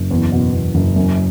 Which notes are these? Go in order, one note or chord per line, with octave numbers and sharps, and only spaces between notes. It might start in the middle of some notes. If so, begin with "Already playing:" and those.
Already playing: F#1
E2
B2
E2
F#1
F#2